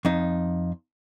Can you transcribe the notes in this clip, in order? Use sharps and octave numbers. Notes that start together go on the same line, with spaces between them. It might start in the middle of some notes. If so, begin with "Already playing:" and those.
F2 D#4